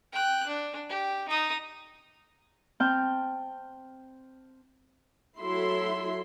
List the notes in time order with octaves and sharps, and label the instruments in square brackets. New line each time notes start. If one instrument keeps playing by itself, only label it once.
[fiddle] G5 F#6
D4
G4
D#4 D#6
[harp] C4 G5 A5 F6 G6
[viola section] F#3 E4 A4 E5 C6